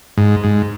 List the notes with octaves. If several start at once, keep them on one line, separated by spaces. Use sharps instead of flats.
G#2
G#2